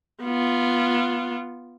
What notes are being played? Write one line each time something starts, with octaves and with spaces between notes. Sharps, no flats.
B3 F4